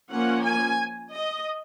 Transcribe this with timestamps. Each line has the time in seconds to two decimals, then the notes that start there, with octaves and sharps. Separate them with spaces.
0.10 F3 A#3 C#4 F#5
0.44 G#5
1.12 D#5